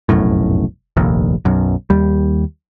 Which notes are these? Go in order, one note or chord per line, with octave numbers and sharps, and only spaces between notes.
F1 B1 F#2 A2
F1 A#1 D#2
B1 F#2
D#2 G3